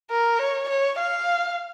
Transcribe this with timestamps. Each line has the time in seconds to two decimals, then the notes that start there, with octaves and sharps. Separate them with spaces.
0.11 A#4
0.39 C#5
0.69 C#5
0.99 F5